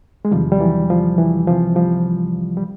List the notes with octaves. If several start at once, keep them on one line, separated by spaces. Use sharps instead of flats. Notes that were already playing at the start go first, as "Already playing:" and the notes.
G#3
E2 C3 D#3 F3 G3
G3
E3 F#3
F3
E3
C2 C3 E3 F3
F3 G3
G3